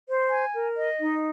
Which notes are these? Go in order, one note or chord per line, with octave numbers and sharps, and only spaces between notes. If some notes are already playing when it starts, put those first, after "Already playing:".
C5
G#5
A#4
D#5
D#4